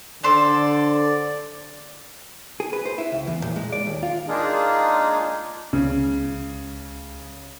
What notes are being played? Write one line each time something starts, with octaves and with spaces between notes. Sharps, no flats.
D3 A4 C5 D5
G#4
B4
C5
E4
C#2
E2
A#2
G#3
D5
D#2
F4
G#3 A#3 D4 D#4 F4 G#4
C#2 C#3